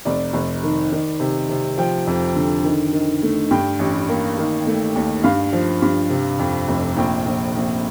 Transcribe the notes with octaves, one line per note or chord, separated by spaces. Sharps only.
F1 D5
F1
D#3
D#3
C3
C3
F3 G5
F2
D3
D#3
D#3
A3
G2 G5
A1
A#3
D#3
A3
D#2
G2 F5
F3
G2
C3
F2
F1
A#1 G5
A#1
A#1